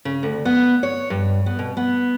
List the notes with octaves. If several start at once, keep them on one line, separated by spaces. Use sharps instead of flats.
C#3
D2
B3
C#5
G2
B3
B2
B3